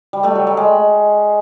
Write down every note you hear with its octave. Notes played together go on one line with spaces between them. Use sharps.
G3
G3 A3
F#3
G3
G#3